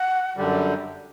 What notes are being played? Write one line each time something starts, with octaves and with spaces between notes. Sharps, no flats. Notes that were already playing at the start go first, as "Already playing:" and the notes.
Already playing: F#5
F#2 D3 G3